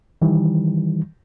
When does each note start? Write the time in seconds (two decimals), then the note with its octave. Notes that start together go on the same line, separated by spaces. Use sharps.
0.22 D#3 E3 G3